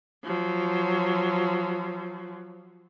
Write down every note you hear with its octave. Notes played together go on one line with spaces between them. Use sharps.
F3 F#3